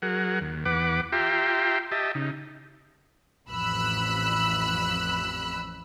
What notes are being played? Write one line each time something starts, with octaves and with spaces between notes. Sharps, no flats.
F#3 G#4 A#4 F#5
D#2
E2 B4 F#5 D6
F4 G4 E5 G5 A#5 C6
G4 D#5 E5 A5
C#3 D#4
A1 F2 B5 E6 F#6